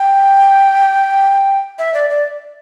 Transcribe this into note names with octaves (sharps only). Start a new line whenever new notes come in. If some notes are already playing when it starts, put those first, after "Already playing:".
Already playing: G5
E5
D5
D5